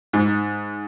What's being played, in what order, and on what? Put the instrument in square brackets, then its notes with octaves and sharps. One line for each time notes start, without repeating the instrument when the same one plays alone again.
[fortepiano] G#2